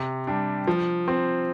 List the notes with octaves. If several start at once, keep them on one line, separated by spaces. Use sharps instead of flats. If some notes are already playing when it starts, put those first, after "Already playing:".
Already playing: C3
G3 D4
F3
C4